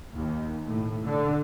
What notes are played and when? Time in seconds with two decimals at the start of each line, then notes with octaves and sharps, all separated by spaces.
0.14 D#2
0.63 A2
1.05 D3